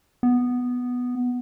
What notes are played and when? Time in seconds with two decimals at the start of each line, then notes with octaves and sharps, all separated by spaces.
0.23 B3